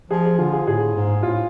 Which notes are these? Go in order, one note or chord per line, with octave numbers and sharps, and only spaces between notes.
F3 G#4
G#4
D3 F4
G#4
A2 G#4
G#2
A2 F4